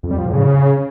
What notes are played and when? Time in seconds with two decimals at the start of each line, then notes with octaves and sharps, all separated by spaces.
0.03 F2
0.11 G3
0.18 F3
0.26 A2
0.33 C#3